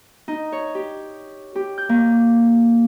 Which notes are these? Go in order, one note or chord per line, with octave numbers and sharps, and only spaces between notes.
D#4
C#5
G4
G4
G6
A#3